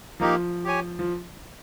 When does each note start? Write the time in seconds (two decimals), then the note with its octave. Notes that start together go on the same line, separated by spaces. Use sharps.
0.20 F3 A#3 D#4 G4
0.64 G4 C#5 G#5
0.99 F3